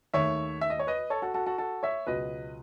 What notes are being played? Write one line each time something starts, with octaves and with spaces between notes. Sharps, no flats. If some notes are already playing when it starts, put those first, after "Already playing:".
D#2 D#3 A3 C#5 E5
E5
D#5
C#5
B4 D#5
A4 C#5
F#4 A4
F#4 A4
F#4 A4
F#4 A4
C#5 E5
C#2 B2 F#3 B4 D#5